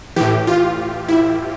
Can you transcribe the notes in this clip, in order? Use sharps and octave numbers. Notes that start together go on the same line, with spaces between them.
A2 E3 G4
F4
E4